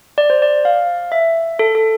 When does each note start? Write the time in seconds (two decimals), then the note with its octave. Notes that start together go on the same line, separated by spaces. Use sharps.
0.18 D5
0.30 C5
0.42 D5
0.65 F5
1.12 E5
1.59 A4
1.75 A4